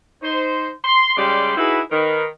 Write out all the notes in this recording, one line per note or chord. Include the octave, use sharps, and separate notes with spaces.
D#4 C5
C6
C#3 G3 G#3 G4 D5 C6
D#4 E4 F#4 G#4 B4
D#3 A#4 B4